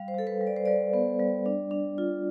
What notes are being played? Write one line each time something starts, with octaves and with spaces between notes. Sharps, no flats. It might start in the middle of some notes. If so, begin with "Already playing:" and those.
Already playing: G3 F5
C5
G3 A4
B4
G3
D5
C5
G3 D5
B3
G3
D4
D4
F4